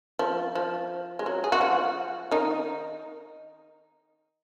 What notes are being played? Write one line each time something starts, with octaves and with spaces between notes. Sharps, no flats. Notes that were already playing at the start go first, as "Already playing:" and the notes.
F3
F3
G#3
F#3
G#4
F#4
F3 F4
D#3 D#4